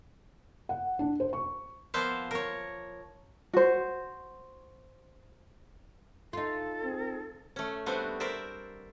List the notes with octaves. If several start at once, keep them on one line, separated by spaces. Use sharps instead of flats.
F#5
D4
C5
C#6
F3 A#3 B3 C5 E5 F5
A#4 C#5
F#4 C5
D#4 F4 A4
C4
A3 C#4
G3 A3 B3 C4 D4 F#4
A#4 C5 D5 E5